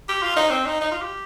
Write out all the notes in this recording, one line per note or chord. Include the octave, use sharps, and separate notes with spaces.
G4
F4
D#4
C4
D#4
D#4
F4
G4